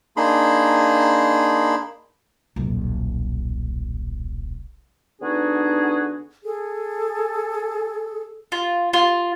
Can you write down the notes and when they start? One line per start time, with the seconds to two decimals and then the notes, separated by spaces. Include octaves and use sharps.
0.17 A#3 D4 D#4 G#4 B5 C6
2.56 D#1 B1
5.22 D3 B3 D4 D#4 F#4 G#4
6.44 G#4 A4
8.52 F4
8.93 F4